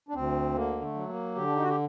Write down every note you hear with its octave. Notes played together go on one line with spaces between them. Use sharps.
D4
D2 C4
D3 A#3
A3
F#3
A#3
D3 G4
D4
D#4
F#4
G4